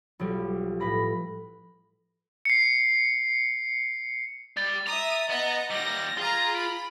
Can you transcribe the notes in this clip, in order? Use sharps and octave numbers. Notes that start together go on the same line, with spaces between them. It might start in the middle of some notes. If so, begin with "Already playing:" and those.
B1 F3 G3
A2 B4 B5 A#6
C7 C#7
G3 A6
E5 A#5 D#6
B3 D#5 F#5 A#5
D#2 G3 A#6
F4 G#4 A#5
B5 D7